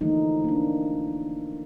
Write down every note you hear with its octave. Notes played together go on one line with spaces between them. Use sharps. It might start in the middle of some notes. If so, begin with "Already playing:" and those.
D3 E3 F3 A3 A#3 D#4
A#3 D4